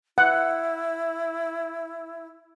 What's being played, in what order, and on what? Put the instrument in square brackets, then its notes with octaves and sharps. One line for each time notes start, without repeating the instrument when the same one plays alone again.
[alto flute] E4 [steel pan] F#5